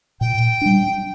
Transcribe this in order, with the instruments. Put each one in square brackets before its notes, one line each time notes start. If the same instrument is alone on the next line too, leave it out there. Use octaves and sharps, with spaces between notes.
[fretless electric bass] A#2 [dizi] G5
[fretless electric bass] G3 D4